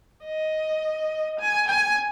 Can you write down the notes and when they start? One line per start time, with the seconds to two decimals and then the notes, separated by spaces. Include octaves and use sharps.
0.24 D#5
1.39 G#5
1.68 G#5